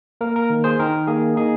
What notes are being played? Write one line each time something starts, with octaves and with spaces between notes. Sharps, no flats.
A#3 A#4
A#4
D#3
G#4 C5
D#3 A#4
A#3 G#4
D#4 G#4